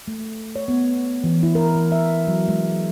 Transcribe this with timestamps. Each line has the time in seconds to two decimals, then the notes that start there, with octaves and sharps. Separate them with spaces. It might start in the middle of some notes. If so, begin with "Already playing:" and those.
0.08 A3
0.56 C#5
0.68 B3
1.24 E3
1.43 E4
1.55 A#4
1.75 E3
1.92 E5
2.27 F#3
2.48 G#3